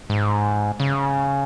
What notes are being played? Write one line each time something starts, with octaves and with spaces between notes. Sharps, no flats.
G#2
C#3